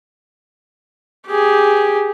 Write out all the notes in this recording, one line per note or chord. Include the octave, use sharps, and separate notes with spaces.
G4 G#4